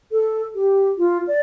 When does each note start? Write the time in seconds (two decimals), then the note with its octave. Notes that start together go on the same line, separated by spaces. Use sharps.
0.12 A4
0.55 G4
0.98 F4
1.27 D5